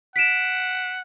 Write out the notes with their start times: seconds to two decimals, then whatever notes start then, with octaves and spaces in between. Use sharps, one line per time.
0.16 F#5 B6 D7 E7